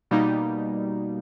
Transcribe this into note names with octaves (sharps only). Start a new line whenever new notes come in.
B2 G3 A#3 D#4